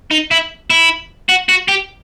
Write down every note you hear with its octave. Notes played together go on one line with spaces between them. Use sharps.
D#4
E4
E4
F#4
F#4
G4